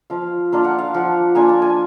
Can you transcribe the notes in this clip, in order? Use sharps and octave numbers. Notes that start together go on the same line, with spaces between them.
F3 F5
A#3 D4 F4 F5
F#5
F5
F3 F#5
A#3 D4 F4 G#5
A5
G#5